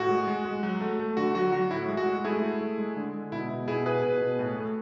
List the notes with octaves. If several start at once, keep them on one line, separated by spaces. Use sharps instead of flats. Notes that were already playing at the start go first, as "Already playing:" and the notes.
Already playing: A2 F#4
G#3
G#3
G#3
F#3
A3
A3
D3 F#4
F#3 F#4
F#3 F#4
A2 E4
G#3
F#4
G#3
A3 E4 G#4
A3
A3
G#3
D3
G#3
B2 E4
B2
B2 E4 G#4
B2 G#4 B4
B2
B2
A2
A3